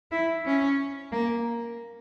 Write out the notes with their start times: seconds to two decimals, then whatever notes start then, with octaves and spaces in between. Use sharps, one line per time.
0.12 E4
0.46 C#4
1.12 A#3